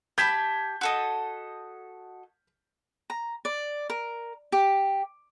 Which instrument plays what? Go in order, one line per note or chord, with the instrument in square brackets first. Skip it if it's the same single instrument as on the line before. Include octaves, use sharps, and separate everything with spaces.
[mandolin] G4 A5 B5 [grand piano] G6 G#6 B6
[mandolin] F#4 A4 D#5
[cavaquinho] A#5
D5
A#4
G4